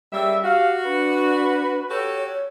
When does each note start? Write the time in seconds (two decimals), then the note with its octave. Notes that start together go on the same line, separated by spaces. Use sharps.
0.12 C#3 G3 A#3 E5
0.44 F#4 G4 F5
0.85 D4 B4
1.89 F#4 G4 A4 C#5